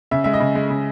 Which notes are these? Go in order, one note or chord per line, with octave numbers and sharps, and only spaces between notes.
C#3 E5
G#3 E5
D#5
C#3
G#3
C#3